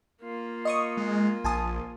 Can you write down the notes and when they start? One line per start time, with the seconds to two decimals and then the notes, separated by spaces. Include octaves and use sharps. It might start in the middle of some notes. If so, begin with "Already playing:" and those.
0.22 A#3 F4
0.65 D#5 C#6 D#6
0.97 G#3
1.44 A#1 G#5 A5 D#6